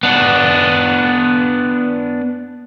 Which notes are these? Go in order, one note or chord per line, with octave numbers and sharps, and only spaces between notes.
B3 D4